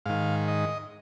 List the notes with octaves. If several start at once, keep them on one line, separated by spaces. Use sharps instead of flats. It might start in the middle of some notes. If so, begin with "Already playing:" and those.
G#2 D#3 F5
D#5